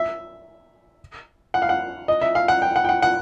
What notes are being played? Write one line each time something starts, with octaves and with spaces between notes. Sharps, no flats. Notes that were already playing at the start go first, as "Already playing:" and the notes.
Already playing: E5
F#5
F5
F#5
D#5
E5
F5
F#5
G5
F#5
G5
F#5
F#5